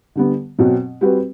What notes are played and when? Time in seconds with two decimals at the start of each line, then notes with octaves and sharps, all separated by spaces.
0.16 D3 G3 B3
0.59 B2 F#3 C4 F#4
1.01 G3 C4 F#4 B4